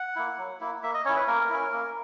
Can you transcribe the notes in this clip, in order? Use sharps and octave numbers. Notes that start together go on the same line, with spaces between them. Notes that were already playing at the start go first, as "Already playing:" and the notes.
Already playing: F#5
A#3 E4
F#3
A#3 E4
A#3 E5
D#5
C#4 E4 C#5
B4
A#3 A#4
C#4 E4
A#3